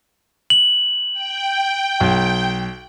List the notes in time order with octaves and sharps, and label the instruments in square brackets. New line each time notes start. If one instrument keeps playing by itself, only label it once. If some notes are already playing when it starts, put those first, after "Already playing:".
[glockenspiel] F#7
[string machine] G5
[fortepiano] B1